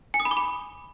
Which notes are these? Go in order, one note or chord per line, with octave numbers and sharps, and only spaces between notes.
G#5
D#6
B5
D6
B5